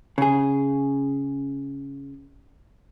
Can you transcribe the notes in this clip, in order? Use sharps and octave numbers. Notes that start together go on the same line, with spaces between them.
C#3 G#4